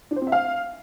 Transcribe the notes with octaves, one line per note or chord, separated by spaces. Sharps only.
D4
C5
C4
E5
F5